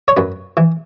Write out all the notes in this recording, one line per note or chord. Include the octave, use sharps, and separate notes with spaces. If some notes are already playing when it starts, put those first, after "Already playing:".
C#5
F#2 B4
E3